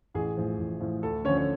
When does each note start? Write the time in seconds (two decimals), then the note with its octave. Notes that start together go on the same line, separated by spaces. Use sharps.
0.14 A1 G#4
0.37 A2 F3
0.59 A1
0.80 A2 F3
1.03 D2 A4
1.25 D3 C#4 C#5
1.29 F3
1.38 C#5